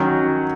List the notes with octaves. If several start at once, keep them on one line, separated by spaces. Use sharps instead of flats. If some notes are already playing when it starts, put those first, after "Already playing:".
Already playing: D#3 F#3 C#4